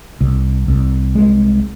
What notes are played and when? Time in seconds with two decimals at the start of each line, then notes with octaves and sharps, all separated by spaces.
0.21 C2
0.68 C2
1.15 G#3